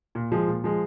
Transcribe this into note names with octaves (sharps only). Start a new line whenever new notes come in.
A#2
F3 G#3
A#2
F3 G#3